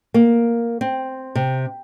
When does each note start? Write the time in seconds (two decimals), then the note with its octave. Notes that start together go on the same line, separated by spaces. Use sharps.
0.14 A#3
0.81 C4
1.35 C3